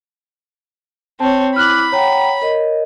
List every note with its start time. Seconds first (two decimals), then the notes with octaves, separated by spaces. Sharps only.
1.20 C4 C#5 A5
1.56 E4 B5 D6 F6 F#6 F#7
1.92 C#5 F#5 G5 A#5
2.42 A#4 D#5